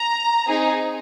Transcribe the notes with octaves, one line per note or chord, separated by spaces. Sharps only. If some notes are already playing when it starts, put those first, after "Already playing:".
Already playing: A#5
C4 D#4 G#4